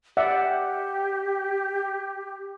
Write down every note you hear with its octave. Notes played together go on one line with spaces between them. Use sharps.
G4 D5 E5 F#5